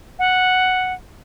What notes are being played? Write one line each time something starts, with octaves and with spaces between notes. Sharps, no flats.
F#5